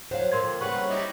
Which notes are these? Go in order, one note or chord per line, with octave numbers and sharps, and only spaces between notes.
F#3 C5 F5
F2 A#2 D3 A#4 C6 G#6
C#3 G3 A#3 B4 F#5 C#6
D#4 E4 D5